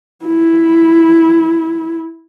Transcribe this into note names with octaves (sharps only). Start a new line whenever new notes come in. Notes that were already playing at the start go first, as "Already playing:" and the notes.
E4